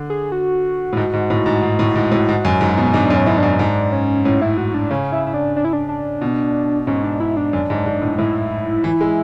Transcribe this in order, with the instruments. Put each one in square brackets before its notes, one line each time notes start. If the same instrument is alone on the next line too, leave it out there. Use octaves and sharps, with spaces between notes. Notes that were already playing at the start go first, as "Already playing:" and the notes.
Already playing: [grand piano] D3
[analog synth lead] G#4
F#4
[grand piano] A2
G#2
G#2
A2
G#2
G#2
A2
G#2
A2
G#2
F#2
G#2
B2
[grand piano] G#2 [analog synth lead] D4
[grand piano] F#2
[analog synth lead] C#4
[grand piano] G#2 [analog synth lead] E4
[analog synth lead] D4
[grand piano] F#2
[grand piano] G#2 [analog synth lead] D4
[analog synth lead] C#4
[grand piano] A2 [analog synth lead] C#4
[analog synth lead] E4
F#4
D4
[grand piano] C#3 [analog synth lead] C#4
[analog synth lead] E4
E4
D4
D4
E4
D4
D4
[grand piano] B2
[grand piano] G#2 [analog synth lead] C#4
[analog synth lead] D4
E4
D4
[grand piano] F#2
G#2
G#2
A2
[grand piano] A2 [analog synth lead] E4
[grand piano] E3
G#3